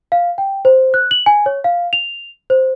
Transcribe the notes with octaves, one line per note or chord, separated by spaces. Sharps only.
F5
G5
C5
F#6
F#7
G#5
C#5
F5
F7
C5